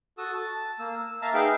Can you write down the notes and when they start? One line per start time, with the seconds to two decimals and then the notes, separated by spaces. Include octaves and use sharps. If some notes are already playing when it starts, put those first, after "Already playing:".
0.18 F#4 A4 D#6 E6
0.34 A5
0.79 A#3 E6
1.02 E6
1.22 A#3 E5 F5 A5 A#5 E6
1.34 D#4 G#4 B4 E5 F5 G5